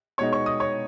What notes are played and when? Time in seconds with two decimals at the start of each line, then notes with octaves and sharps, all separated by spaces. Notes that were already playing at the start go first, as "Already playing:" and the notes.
0.18 B2 G#3 B3 D#4 C#5 C#6
0.33 C#5 C#6
0.46 D#5 D#6
0.60 C#5 C#6